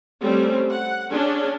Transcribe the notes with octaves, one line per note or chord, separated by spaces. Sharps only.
G3 A3 C4 C#4
F#5
C#4 D4 G#4